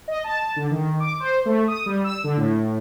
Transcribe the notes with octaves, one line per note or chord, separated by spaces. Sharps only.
D#5
A5
D3
D#3
D6
C5
A3
D#6
G3
E6
D3
A2